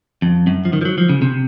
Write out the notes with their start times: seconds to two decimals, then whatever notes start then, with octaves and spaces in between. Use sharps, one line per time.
0.22 F2
0.47 F#2
0.65 F3
0.73 D#3
0.81 F3
0.85 F#3
0.98 F3
1.09 C#3
1.22 C3